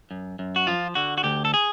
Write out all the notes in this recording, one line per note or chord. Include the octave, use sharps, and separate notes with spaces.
F#2
F#2
F#4
F3 F4
D3 F#4
F#4
D2 G4
A4
G#4